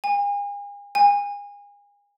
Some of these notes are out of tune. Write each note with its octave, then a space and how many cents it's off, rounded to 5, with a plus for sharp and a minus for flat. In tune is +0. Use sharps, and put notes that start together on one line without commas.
G#5 -40
G#5 -35